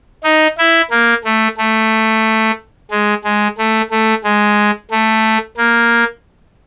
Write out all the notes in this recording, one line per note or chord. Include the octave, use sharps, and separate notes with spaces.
D#4
E4
A#3
A3
A3
G#3
G#3
A3
A3
G#3
A3
A#3